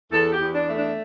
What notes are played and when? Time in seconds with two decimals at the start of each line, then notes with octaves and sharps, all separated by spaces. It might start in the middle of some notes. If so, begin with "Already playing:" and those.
0.11 E2 A4
0.31 G4
0.39 E2
0.53 D4
0.67 A3
0.74 D4